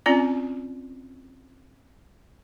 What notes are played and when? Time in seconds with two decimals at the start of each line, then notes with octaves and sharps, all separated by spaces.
0.06 C4 C#4 F4 D5 A#5